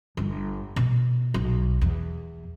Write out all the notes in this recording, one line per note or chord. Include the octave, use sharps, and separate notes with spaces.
G1
B2
B1
E2